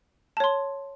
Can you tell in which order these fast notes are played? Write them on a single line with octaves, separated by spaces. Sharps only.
A5 C#5 C6